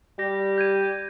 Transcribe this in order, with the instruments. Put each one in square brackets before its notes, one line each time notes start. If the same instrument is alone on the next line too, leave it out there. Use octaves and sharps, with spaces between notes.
[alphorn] G3 [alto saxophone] G4 [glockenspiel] A#6
[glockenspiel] G6 G#6 D#7